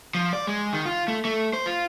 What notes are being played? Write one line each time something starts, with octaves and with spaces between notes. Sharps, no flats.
F3
D5
G#3
D#3
F4
A3
A3
C5
F4